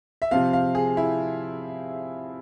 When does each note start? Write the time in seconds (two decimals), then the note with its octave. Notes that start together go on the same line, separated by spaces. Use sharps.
0.22 E5
0.31 C3 F3 C4 F5
0.53 F5
0.75 G#4
0.97 E4